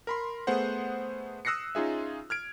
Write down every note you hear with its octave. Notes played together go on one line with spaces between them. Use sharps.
A#4 B5 C6
A3 B3 G#4 C5 F#5
D#6 E6 F#6 A#6 C7 C#7
C#4 D#4 F4 G#4 E5
F6 G#6 D7